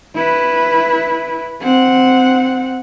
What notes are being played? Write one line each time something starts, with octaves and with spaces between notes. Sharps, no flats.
E4 B4
C4 F#5